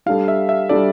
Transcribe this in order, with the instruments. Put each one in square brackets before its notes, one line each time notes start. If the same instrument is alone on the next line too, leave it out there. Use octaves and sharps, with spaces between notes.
[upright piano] G3 D4 A4 [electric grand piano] F5
[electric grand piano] E5
E5
[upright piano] G3 D4 A4 [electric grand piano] D5